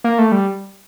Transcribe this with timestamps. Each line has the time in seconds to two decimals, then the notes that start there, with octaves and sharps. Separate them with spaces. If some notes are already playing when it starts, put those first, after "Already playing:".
0.04 A#3
0.19 A3
0.32 G3